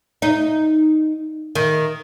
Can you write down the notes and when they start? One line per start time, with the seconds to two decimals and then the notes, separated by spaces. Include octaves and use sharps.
0.22 D#4
1.55 D#3